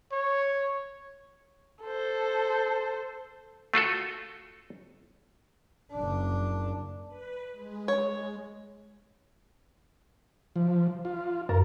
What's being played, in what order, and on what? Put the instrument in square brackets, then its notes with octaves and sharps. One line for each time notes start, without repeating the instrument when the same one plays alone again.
[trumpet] C#5
[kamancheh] A4 C5
[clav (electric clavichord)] A3 F4 F#4 A4
[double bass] F#1 D4
[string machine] B4
G#3
[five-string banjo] C#5
[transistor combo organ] F3
F4
[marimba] F#2 [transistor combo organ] A#4